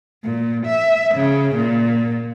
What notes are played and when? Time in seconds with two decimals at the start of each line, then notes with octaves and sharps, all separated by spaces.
0.24 A#2
0.66 E5
1.14 C#3
1.55 A#2